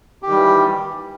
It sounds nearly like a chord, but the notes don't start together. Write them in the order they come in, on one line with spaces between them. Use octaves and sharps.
G4 D#3 G3 E3